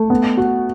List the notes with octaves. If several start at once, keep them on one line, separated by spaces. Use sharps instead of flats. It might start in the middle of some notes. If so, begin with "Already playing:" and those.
Already playing: A3
B3
F#4